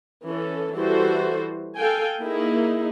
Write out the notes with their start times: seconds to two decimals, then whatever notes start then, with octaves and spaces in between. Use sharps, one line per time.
0.24 E3 C#4 A4
0.73 E3 G3 E4 F#4 A4 C5
1.77 A4 F5 G5 G#5
2.20 A#3 D#4 E4 G#4